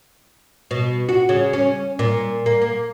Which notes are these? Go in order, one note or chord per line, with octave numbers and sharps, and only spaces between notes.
B2
F#4
C#3
C#4
A#2
A#3
A#3